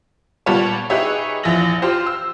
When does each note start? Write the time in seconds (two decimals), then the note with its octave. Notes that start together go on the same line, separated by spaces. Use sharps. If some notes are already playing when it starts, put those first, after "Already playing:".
0.46 A#2 G3 B3 G4 C#5 A5
0.90 D#4 G4 G#4 B4 C#5 E5
1.43 A#1 E2 E5 A#6 F#7
1.82 F4 G4 C5
2.07 E6